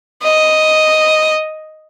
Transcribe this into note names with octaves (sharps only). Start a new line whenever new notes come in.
D#5